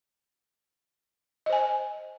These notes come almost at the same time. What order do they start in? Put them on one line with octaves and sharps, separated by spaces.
D#5 C5 G#5